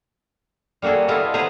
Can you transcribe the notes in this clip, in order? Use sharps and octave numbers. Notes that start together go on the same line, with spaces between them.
G3 A#3 F#4 G#4 A4
B3 E4 F4 A4 D#5 F5
B3 G#4 B4 C5 A#5